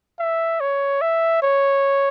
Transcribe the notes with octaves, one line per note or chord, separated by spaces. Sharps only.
E5
C#5
E5
C#5